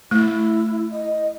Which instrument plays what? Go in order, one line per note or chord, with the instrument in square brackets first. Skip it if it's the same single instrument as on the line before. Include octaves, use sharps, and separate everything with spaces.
[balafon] A3 [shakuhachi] E4
[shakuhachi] D#5